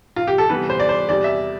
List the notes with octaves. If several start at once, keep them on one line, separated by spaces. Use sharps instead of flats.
F4
G4
A4
C3 E3 G3 B3 B4
C5
D5
C5
E2 C3 G3 D5
E5